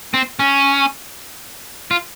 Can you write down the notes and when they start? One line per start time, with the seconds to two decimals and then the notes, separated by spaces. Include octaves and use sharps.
0.14 C4
0.39 C#4
1.91 F4